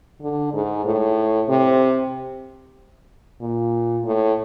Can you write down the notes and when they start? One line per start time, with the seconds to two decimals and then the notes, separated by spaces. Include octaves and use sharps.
0.21 D3
0.53 G#2
0.86 A2
1.49 C3
3.41 A#2
4.05 A2